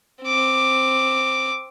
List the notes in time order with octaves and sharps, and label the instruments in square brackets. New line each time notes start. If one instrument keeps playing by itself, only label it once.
[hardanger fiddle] C4 D6